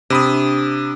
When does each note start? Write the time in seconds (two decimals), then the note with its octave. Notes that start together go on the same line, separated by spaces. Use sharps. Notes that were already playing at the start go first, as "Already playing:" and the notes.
0.10 C3 D4 B5 D#6